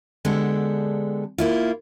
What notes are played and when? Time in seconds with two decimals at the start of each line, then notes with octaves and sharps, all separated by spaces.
0.25 D3 G#3 B3 D4 G4 A4
1.38 A#3 E4 F4